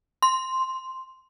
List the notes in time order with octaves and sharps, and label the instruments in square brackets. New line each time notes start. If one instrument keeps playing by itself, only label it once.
[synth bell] C6